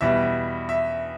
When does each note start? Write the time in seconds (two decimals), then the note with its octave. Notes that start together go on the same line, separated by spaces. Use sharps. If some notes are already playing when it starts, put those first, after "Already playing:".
0.01 E2 B2 G3 E5
0.69 E5